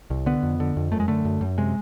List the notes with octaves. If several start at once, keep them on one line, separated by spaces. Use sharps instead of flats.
C2
D3 B3
F2
D3
F2
F#2 A3
G#3
D3 A3
F#2
F#2
C3 G#3